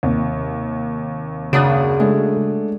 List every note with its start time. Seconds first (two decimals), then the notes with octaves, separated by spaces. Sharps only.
0.03 D#2 C3
1.53 F#2 C#3 D4 D#6
2.00 G#3 A3 D4